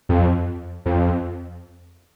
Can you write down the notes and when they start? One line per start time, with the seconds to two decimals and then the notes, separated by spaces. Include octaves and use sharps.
0.09 F2
0.86 F2